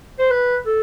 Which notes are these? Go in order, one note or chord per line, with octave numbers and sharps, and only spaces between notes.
C5
B4
A4